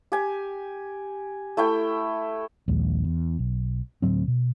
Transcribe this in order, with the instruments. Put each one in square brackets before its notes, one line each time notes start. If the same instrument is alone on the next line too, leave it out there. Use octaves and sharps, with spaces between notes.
[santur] G4 G#5
A3 E4 G5
[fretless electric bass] A#1 D#2 G#3
E2
B1
D2 A2 F#3 C4
B2